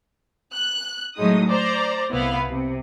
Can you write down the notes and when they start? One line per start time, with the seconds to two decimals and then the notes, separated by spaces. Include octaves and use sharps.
0.52 F#6
1.16 A2 F#3 G#3 D#4 D#6
1.48 C5 D5 A#5
2.10 C2 B3 E4 B4 F5
2.48 C3